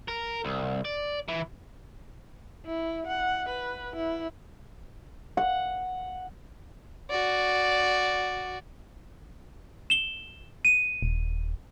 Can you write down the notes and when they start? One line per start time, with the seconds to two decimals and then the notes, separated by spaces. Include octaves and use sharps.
0.08 A#4
0.45 C2
0.85 D5
1.28 E3
2.66 E4
3.07 F#5
3.49 B4
3.96 E4
5.37 F#5
7.10 F#4 D5
9.90 E7 G7
10.65 D#7
11.02 D#1